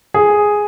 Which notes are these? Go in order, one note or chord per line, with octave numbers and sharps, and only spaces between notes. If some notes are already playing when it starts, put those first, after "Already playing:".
G#4